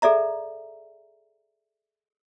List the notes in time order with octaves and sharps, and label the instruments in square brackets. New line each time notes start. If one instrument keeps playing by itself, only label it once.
[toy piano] G#4 A4 D5 E5 A#5